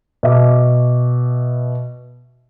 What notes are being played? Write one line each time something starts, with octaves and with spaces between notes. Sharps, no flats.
B2 E5 D6